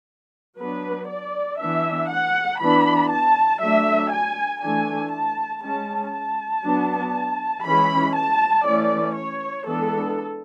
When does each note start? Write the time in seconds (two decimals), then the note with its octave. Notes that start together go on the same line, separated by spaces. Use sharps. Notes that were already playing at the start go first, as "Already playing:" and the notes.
0.59 F#3 B3 D4 B4
1.10 D5
1.60 E3 B3 D4 E5
2.10 F#5
2.61 E3 B3 D4 B5
3.11 A5
3.61 F#3 A3 D4 E5
4.12 G#5
4.62 E3 A3 D4 G#5
5.12 A5
5.63 G#3 C#4 A5
6.14 A5
6.64 F#3 B3 D4
7.65 E3 G#3 C#4 B5
8.15 A5
8.66 E3 A3 C#4 D5
9.16 C#5
9.67 E3 G#3 B3 D4 A4